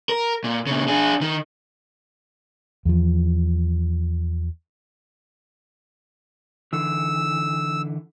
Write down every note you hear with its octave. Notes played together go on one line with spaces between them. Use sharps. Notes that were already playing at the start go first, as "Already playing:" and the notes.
A#4
A#2
A#2 C#3
D4 G#4
D#3
E2 F3
D3 E3 E6